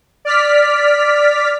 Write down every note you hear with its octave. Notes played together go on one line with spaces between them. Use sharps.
D5 F6 B6